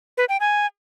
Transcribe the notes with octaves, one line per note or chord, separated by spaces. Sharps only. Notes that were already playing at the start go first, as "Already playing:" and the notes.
B4
G5
G#5